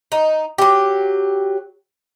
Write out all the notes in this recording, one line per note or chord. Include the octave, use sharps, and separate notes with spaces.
D#4
F#3 G4